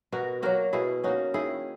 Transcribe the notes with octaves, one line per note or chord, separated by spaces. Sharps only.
B2 F#4 A#4
F#3 A#3 F#4 A#4
B2 E4 G#4
A#3 C#4 D#4 F#4
D#3 E4 G#4